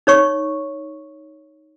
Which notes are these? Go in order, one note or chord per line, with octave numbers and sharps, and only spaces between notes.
D#4 C#5 C#6